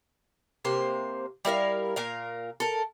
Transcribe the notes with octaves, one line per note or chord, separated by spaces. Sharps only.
C3 A#3 C5
G3 E4 A#4 F5
A#2 A#4 F5
A4 A#4